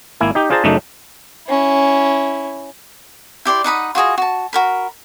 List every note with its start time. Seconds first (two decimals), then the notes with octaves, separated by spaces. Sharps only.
0.20 G#1 A#3 E4 G#5
0.35 D#4 G4
0.50 D4 F4 G#4 C5 A5 A#5
0.64 F#2 C#3 A3 D4 D#4
1.48 C#4 E4
3.45 E4 G4 D5 C6
3.64 D#4 F#5 B5 D#6
3.95 F4 F#4 G#4 D#5
4.18 F#4 A5
4.53 F#4 A#4 B5